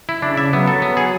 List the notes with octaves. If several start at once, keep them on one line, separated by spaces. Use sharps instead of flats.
E4
C#3 D4
E5
F#3 B3
A4
B3
G#4